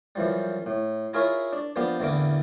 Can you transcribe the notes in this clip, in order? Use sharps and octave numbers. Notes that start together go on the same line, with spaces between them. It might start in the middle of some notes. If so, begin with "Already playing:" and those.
F#2 E3 F3 G3
A2
E4 F4 G#4 A#4 C#5 E5
D4
F3 A#3 B3 D4 G4
A1 E2 D3 A#3 E4 D6